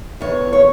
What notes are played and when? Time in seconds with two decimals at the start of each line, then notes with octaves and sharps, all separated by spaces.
0.21 E2 C#5
0.53 C#5